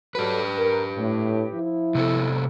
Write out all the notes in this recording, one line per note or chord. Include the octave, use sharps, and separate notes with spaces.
F#3 G4 A4 B4
A#4
A2
F3 E4
C3 B3 A4